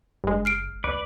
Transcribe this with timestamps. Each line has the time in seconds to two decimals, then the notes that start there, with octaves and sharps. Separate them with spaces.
0.24 F#1 G2 G#3
0.45 F6 C7 D7
0.84 C#2 B4 D5